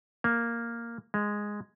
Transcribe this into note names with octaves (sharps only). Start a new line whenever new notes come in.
A#3
G#3